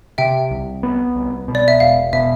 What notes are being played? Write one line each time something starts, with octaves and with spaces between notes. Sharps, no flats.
C3 E5 G5
C2
B3
C2
B2
D5
E5
E1 F5
B2 E5